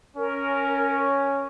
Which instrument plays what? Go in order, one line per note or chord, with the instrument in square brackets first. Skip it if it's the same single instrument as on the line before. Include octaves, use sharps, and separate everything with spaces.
[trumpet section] C#4 [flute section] A#4